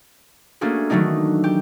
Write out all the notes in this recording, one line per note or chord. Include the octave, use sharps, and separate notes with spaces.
A3 A#3 C#4 D4 F#4 G#4
D#3 E3 F#3 A3 D4 D#4
G4